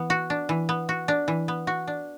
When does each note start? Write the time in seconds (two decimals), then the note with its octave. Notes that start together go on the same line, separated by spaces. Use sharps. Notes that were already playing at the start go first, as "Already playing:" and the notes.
Already playing: E3 B3
0.10 F#4
0.30 D4
0.49 E3
0.69 B3
0.89 F#4
1.08 D4
1.28 E3
1.48 B3
1.67 F#4
1.87 D4